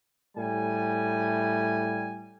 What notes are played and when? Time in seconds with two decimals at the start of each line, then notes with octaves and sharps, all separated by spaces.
0.37 A2 G3 G#5